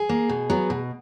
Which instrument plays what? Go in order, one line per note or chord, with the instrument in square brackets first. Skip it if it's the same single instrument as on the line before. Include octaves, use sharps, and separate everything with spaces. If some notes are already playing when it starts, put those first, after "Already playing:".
Already playing: [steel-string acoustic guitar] G#4
A#3
B2
F#3 B3
B2